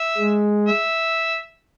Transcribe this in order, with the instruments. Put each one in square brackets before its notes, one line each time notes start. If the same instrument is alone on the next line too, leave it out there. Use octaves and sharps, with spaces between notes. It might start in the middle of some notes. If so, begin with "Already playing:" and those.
Already playing: [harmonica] E5
[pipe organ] G#3
[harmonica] E5